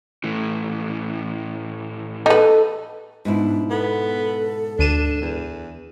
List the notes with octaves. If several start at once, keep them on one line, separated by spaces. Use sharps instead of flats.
A2 E3
D#4 A4 B4
G#2 B2 D4 E4
B3 A4
D2 D4 D#7 E7
E2